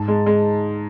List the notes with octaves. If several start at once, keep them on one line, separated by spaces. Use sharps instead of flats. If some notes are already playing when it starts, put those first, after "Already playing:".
Already playing: G#2 A5
G#3
G#3